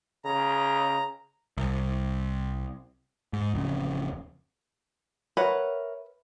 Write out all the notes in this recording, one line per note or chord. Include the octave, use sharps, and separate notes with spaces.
C#3 A#5
C2
G#2
D1 F2 C#3
A#4 B4 C#5 E5 F#5